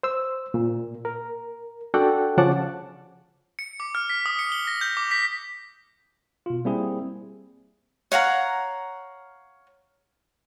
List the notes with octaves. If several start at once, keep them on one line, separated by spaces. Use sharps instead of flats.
C5 E6
A#2
A#4
D4 F#4 A4 D5 F#5 G5
C#3 F3 C#4 F#5 A5 D6
C#7
D6
F6
B6
D#6
C#7
G7
A#6
G6
D6
B6
B2 F4
G3 A#3 C4 E4 G#4
C#5 F5 F#5 A#5